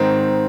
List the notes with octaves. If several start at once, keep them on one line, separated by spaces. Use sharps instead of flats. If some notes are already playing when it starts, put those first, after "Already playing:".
Already playing: G#2 D#3 C4